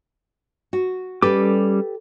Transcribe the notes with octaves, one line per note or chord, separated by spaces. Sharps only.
F#4
G3 C#4 G4 A4 B4 D6